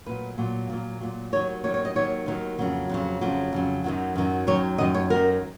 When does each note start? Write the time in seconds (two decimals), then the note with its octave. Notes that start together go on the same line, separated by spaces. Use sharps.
0.06 A#2 F#3 B4
0.38 A#2 F#3
0.70 A#2 F#3
1.01 A#2 F#3
1.32 D#2 D#3 F#3 C#5
1.64 D#2 D#3 F#3 C#5
1.74 C#5
1.85 D#5
1.95 D#2 D#3 F#3 C#5
2.26 D#2 D#3 F#3
2.59 F2 C#3 F#3
2.89 F2 C#3 F#3
3.21 F2 C#3 F#3
3.53 F2 C#3 F#3
3.84 F#2 D#3 F#3
4.16 F#2 D#3 F#3
4.47 F#2 D#3 F#3 C#5
4.78 F#2 D#3 F#3 D#5
4.94 C#5
5.10 F#2 D#3 F#3 A#4